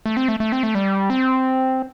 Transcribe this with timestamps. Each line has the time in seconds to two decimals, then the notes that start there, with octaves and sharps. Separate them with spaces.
0.06 A3
0.17 C4
0.28 A3
0.40 A3
0.52 C4
0.63 A3
0.75 G3
1.10 C4